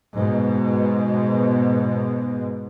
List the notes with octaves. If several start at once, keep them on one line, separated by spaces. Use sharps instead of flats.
G#2 B2